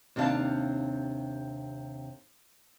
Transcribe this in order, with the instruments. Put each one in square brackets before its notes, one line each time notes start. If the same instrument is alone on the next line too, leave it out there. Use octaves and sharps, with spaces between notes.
[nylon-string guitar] D#2 C3 D4 F#4 F5 A5